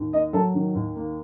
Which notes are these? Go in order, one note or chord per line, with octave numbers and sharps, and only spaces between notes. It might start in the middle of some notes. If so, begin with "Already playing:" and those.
Already playing: D#2
A#3 D#5
F#3 A4
D#3
D#2
A#3